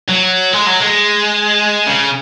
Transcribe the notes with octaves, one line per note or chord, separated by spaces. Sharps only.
F#3
G#3
F#3
G#3
C#3